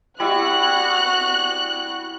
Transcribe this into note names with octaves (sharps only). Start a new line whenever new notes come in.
G3 E4 F#4 E5 F#6